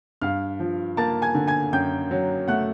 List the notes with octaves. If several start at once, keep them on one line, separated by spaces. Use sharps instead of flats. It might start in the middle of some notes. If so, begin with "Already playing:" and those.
G2 F5 F6
F3
A#3 A5 A6
G#5 G#6
D3
G#5 G#6
F#2 G5 G6
F#3
A3 F#5 F#6